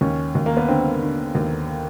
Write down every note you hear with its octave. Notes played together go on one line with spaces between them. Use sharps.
D#2 C#4
D#2
A#3
B3
D3 C4
D3
D#2